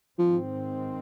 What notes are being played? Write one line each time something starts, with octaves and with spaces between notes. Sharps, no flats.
G#2 D#3 F3 C4